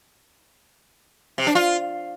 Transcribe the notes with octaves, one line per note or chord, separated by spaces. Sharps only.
C3
D4
F4